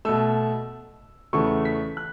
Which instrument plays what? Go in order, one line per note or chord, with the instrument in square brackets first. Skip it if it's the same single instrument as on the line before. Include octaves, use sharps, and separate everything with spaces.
[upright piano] B2 A3 E6
E2 C#3 A3 C#6
B6
F#6